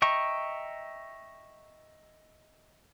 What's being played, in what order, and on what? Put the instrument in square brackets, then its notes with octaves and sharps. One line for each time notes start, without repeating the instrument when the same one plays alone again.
[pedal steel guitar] D#5 E5 G5 A#5 C#6